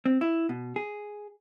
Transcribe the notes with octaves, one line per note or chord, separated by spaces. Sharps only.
C4
E4
B2
G#4